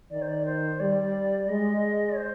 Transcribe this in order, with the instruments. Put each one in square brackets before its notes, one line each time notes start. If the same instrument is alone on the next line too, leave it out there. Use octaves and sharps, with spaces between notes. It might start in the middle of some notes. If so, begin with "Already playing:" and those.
[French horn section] D#3 [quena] D5
[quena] C5
D5
C5
[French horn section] G3 [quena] D5
[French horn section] G#3 [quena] D#5
[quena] C5